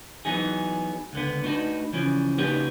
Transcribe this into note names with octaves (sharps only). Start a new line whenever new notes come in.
E3 F#3 B3 D#4 G#4
C#2 D3 B3
A3 D4 D#4 F#4 B4
C#3 E3 F3 C#4
C#3 A#3 D#4 F#4 G4 B4